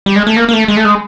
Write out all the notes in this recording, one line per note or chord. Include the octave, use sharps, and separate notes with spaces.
G3
G#3
A3
A#3
A#3
A3
G#3
A3
G#3